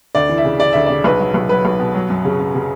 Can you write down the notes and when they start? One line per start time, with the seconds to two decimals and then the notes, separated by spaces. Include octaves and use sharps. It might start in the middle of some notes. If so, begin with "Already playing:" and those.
0.15 D2 D5
0.29 E3
0.38 E5
0.45 C#3
0.59 C#3 D5
0.73 D2 E5
0.86 C#3 D5
1.04 B1 B4
1.20 F#3
1.34 B1
1.49 F#3 B4
1.65 B1
1.79 B2
1.95 F#3
2.10 F#2
2.25 C#3
2.39 C#3
2.55 C#3